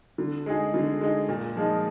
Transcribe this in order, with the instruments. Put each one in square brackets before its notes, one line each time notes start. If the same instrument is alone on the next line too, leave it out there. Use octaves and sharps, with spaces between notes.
[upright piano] D3
G#3 D#4 G#4
D3
G#3 D#4 G#4
A#2
F3 G#3 D#4